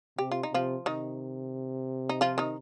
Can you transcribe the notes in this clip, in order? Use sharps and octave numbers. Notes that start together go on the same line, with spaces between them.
C3 G4
F4
D#4
C3 F3 F4
C3 D#3 D#4
D#4
F3 F4
D#3 D#4